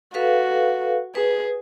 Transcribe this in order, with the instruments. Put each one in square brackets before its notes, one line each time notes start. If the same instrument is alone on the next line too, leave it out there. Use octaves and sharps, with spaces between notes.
[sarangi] F#4 [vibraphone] A4 B4 F5
[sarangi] G#4 [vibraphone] B4